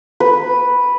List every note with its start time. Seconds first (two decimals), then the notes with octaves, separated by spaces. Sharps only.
0.20 B4